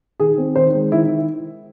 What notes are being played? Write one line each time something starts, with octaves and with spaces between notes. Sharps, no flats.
D#3 G#4
C4
D#3 C5
G#3
D#3 E4